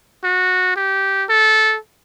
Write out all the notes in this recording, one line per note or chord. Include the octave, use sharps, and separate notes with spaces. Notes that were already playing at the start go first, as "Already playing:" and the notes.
F#4
G4
A4